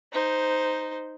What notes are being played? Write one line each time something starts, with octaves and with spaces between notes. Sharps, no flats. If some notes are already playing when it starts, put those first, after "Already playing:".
D#4 C5